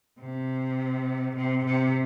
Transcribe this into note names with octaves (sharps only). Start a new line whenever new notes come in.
C3
C3
C3